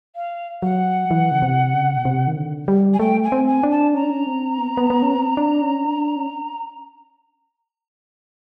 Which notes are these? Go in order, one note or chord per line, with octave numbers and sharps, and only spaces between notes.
F5
F#3 F#5
E3
C#3
C3
C#3
B2
C3
D#3
D3
G3
G#5
A3 G5
G#5
C4
G#5
D4
A5
C#4 A#5
D4
C#4
C4
B3
C4
B3
B3
C#4
C4
D4
C#4
D4
C#4